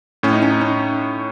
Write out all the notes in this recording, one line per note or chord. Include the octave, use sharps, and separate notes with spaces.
A2 C#4
D#4
C#4
D#4
C#4